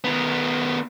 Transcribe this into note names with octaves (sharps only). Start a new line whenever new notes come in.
D#3 B3